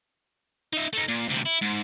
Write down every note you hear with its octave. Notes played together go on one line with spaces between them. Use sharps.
D#4 E5
A3 D#4
A#2
D2 C3
E4
G#2